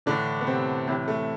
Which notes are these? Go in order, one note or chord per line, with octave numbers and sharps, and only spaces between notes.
A2 D3 E3 D4
B3
C3 C4
A2 C3 E3 C4
A3